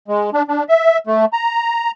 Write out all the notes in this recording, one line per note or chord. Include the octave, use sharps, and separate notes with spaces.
G#3
D4
D4
E5
A3
A#5